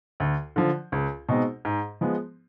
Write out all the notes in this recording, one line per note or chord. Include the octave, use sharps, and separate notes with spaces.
D2
D3 F3
C#2
B2 G#3 C4 D#4
G#2
F3 G#3 B3